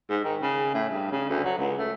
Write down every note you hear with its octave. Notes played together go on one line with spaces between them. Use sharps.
G#2
D#3
C#3
A2
G2
C#3
D2
F#3
C#2
A3